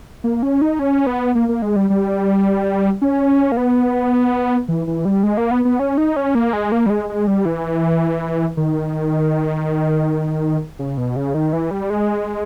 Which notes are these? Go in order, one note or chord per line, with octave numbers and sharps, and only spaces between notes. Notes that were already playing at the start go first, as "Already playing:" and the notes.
A#3
C#4
D#4
C#4
B3
A#3
A#3
G#3
G3
G3
C#4
A#3
B3
E3
E3
G3
G#3
A#3
B3
B3
C#4
D#4
C#4
A#3
G#3
A#3
G3
G#3
G#3
G3
E3
D#3
C#3
B2
C#3
D#3
E3
G3
G#3